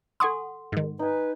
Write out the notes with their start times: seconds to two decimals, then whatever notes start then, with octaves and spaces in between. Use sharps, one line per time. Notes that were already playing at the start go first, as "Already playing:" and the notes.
0.20 A4 F#5 G#5 C6 C#6 D#6
0.72 G#2 D#3
0.99 D#4 B4 G#5